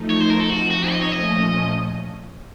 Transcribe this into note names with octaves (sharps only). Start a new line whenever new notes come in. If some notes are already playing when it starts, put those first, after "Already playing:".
Already playing: F3 A3 D#4
C#5
C5
A#4
A4
F3 C4 D#4 F#4
F#4
D#5
C#5
A#2 F3 A3 C#4 D#5